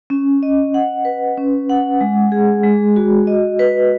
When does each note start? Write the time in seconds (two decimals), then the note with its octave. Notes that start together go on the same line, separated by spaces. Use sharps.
0.10 C#4
0.43 D#5
0.74 F#5
1.05 B4
1.37 C#4
1.69 F#5
2.01 G#3
2.32 G#4
2.63 G#3
2.96 F#4
3.27 D#5
3.59 B4